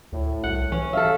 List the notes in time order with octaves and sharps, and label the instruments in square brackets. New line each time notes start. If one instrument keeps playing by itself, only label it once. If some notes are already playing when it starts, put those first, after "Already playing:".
[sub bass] D2 [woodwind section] A2
[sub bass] C2 [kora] F#5
[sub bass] E3 [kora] C#4
[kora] A4 E5 [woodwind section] F5